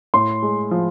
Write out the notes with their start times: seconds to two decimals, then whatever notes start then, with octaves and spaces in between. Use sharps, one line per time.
0.14 A2 C6
0.42 G#3
0.71 F3